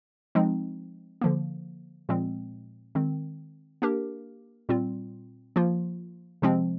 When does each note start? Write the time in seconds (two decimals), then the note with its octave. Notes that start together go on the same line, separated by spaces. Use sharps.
0.35 F3 G#3 C4 D#4
1.21 D3 F3 A#3
2.09 A#2 F3 G#3 C4
2.95 D#3 G#3 C4
3.82 A#3 D4 G4 A#4
4.69 A#2 G3 C4 F4
5.56 F3 A#3 F4
6.42 C3 F3 G#3 C4